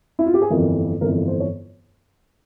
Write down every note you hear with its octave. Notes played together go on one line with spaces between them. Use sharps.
E4
F4
G4
G#4
G1 F2 E3 A#4
G1 F2 E3 A#4
C5
C#5